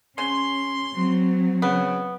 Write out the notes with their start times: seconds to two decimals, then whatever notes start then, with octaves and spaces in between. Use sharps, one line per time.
0.18 C#3 C#4 C6
0.94 F#3 C4
1.62 C#3 B3